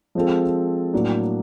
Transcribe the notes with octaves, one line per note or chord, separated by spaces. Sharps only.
F3 G#3 C4 F4 A4
A2 F#3 A#3 D4